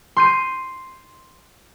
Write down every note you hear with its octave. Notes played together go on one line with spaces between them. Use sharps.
C6 G6 D#7